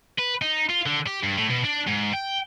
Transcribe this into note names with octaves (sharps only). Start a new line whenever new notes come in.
B4
D#4
F4
D3
G4
G2
A2
B2
D4
G#2
G5